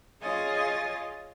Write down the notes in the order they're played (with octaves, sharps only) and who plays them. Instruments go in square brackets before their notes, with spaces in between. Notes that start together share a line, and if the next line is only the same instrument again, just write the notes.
[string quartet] F4 G#4 C#5 D#5 G#5 A6